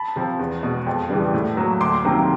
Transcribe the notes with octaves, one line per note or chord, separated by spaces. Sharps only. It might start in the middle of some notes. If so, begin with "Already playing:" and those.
Already playing: A5 B5
C3 F3
E2
B2 G#3
F2
C#3 E3 G3
A2
F#3 A#3
D2 C6 D6
C3 D#3 F#3 A#3